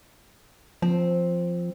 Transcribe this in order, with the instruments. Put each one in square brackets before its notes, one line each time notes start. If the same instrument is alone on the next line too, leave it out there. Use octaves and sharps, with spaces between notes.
[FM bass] F3 [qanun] C4